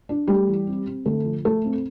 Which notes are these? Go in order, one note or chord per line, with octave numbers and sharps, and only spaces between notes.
D4
G3 A3 G4
E3
C4
C4
D3 A3 A4
F3
A3 A4
C4